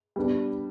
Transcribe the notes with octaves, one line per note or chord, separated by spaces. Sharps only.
G3 B3 D4